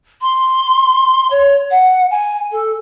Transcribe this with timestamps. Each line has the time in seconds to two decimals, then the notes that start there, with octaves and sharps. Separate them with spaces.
0.22 C6
1.31 C#5
1.71 F#5
2.11 G#5
2.51 A4